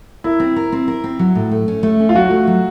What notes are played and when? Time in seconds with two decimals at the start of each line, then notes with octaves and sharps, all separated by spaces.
0.24 E4 A#4
0.40 C4
0.56 A#4
0.72 C4
0.88 A#4
1.04 C4
1.19 F#3
1.35 A2
1.51 A3
1.68 C#4
1.83 A3
2.00 C#4
2.09 F4
2.15 F#3 F#4
2.31 A3
2.47 F#3